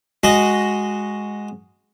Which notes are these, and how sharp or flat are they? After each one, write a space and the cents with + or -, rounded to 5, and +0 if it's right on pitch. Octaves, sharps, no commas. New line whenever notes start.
G#3 +0 F#4 +0 D#5 +0